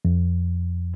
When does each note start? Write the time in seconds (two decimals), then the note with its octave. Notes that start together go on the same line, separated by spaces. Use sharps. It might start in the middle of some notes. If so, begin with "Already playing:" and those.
0.05 F2